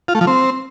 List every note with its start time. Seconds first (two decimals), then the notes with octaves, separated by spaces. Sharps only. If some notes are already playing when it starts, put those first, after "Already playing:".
0.08 F4
0.15 A3
0.21 F3
0.27 C4